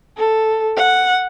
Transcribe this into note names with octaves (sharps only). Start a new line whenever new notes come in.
A4
F#5